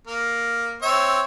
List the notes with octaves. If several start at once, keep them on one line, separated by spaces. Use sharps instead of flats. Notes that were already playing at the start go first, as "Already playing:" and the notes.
A#3
C4 C#5 E5